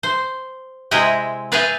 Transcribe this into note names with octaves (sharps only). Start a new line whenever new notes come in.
C5
C3 G#3 E4 D#5 E5 G5
G#4 B4 D5 E5 F5 G5